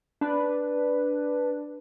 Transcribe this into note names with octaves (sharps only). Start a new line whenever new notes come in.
D4 B4